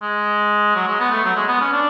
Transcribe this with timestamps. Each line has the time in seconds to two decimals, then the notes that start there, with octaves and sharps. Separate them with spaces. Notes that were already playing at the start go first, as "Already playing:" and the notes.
0.02 G#3
0.76 F#3
0.88 G#3
1.00 B3
1.11 A3
1.24 F#3
1.36 G#3
1.48 B3
1.61 C#4
1.73 D4